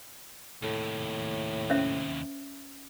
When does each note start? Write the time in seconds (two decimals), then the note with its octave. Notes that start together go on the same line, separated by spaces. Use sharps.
0.63 D#2 A2 C3
1.70 C#4 C5 E5